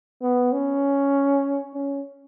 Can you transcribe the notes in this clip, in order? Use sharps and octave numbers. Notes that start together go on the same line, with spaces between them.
B3
C#4
C#4